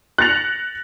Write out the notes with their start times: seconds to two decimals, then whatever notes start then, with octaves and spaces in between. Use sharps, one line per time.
0.18 F#6 A6 A#6 C#7 F7